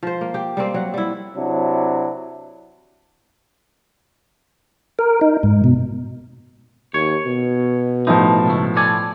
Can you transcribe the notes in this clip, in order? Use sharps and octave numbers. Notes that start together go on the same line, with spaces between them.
F3 C5
A#3
G4 G5
G3 A#3 C4
F#3 F#5
G3 E4
C3 F#3 D4 E4
A#4
D#4
G#2
B2
D#2 C#5
B2
A2 F3 D#4
C#2 A3
A4 D5 G#5